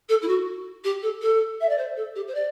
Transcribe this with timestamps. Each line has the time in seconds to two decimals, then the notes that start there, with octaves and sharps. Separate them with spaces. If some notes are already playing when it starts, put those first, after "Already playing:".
0.09 A4
0.22 E4
0.28 F#4
0.84 G4
1.02 A4
1.21 A4
1.60 E5
1.69 D5
1.77 C5
1.96 A4
2.15 G4
2.27 C5
2.34 D5